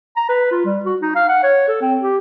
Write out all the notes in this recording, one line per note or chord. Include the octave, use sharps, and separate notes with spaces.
A#5
B4
F4
G3
F#4
D#4
F5
F#5
C#5
A4
C4
G4